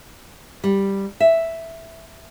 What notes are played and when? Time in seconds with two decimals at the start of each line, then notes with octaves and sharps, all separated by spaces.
0.64 G3
1.20 E5